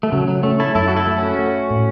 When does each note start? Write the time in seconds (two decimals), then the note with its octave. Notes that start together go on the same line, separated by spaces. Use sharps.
0.03 A3
0.12 C#3 F#3
0.28 F#3
0.43 A3 C#4
0.60 E4 A4
0.75 F#2 E4 A4
0.88 F#4
0.96 E4 A4
1.07 A3
1.18 C#4 F#4
1.39 A3
1.71 A2